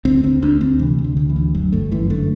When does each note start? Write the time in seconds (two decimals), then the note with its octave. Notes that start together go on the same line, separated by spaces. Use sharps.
0.05 D2 C4
0.24 D2 C4
0.42 D2 D4
0.61 D2 C4
0.79 C3 E3
0.99 D2
1.04 D3
1.17 D2
1.30 E3
1.36 D2
1.55 G1 F#3
1.72 G1 A3
1.92 F#2 E3
2.10 D3 A3